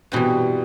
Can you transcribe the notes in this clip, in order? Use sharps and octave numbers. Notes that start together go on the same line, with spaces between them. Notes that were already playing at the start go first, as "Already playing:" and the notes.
G2 B2 E3 G3 C4